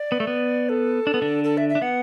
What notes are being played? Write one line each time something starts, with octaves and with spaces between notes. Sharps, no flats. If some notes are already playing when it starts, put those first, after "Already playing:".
Already playing: D5
B3
A3
B3
A4
D4
B3
D3 D4
A4
E5
E5
D4
B3 F#5